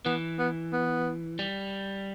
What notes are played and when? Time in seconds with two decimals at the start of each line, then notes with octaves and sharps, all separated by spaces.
0.05 E3 B3
0.39 B3
0.73 B3
1.39 G3